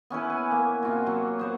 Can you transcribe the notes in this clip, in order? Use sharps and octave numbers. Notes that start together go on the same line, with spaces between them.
B3 C#4 E4 B4
G#5
A#3
C3 F4 F#4
F#3
B3 C5 C#5